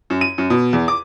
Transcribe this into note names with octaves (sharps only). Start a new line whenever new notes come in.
F#2
D#7
F#2
B2
E2
D6